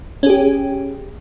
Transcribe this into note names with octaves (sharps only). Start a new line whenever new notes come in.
C#4 G4 G#4